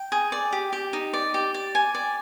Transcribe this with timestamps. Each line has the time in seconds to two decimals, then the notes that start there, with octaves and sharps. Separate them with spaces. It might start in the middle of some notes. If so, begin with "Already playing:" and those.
Already playing: G5
0.12 G#4
0.32 D5
0.53 G4
0.73 G4
0.93 D#4
1.13 D5
1.34 G4
1.54 D5
1.75 G#5
1.95 D5